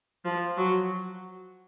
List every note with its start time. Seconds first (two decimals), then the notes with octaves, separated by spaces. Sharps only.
0.25 F3
0.57 F#3